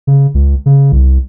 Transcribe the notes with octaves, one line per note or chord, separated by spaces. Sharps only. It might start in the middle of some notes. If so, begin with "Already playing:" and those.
C#3
C#2
C#3
C2